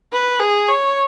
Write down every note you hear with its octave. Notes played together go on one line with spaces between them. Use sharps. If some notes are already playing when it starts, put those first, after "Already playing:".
B4
G#4
C#5